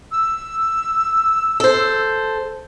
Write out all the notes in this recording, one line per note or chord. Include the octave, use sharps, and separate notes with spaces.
E6
A4 C5